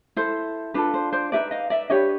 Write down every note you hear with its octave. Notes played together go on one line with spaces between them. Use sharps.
E4 A4 C5
D4 F4 A4 B4
C5
C5 D5
D#4 G4 B4 D5 E5
D#5 F5
D5 E5
D4 G4 B4 C#5 D#5